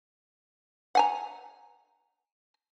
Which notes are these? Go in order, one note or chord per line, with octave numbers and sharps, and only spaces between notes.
F#5 G#5 A#5